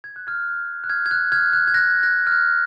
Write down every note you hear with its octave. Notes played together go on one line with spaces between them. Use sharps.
G#6
F#6
F6 G#6
F#6
F6 G#6
G#6
F#6
F6 G#6
F#6
G#6
F#6 A#6
F#6 A#6
F6
F#6